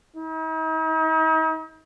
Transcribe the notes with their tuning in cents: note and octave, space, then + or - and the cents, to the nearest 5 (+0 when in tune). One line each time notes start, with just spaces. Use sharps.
D#4 +45